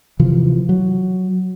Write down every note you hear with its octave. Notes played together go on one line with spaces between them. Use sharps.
C3 E3 F3
F#3